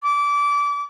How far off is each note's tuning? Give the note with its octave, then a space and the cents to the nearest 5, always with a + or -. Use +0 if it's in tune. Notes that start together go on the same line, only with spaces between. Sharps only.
D6 -25